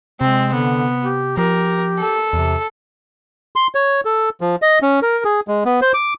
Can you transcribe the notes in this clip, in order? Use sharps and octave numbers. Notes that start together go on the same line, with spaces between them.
C3 G#3 C4
D3 B3
G4
F3 G4 A#4
A4
E2 C3
C6
C#5
A4
F3
D#5
C#4
A#4
G#4
G#3
B3
C5
D6